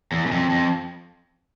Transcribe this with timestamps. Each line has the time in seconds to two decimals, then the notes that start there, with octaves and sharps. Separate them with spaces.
0.12 E2
0.26 F#2
0.31 F2
0.50 F2